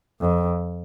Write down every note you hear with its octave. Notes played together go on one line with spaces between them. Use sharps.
F2